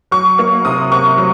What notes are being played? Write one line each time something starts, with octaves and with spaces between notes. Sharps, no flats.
F#3 C#6
A#3 C#6
C3 D#6
C3 C#6
F#3